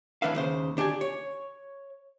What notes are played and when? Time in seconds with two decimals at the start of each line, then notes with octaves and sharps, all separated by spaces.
0.22 A2 E3 D4 B4 E5 F5
0.35 D#2 C#3 C5
0.77 D2 D4 G4 D5 G#5
1.01 C#5